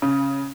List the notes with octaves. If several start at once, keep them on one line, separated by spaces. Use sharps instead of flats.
C#3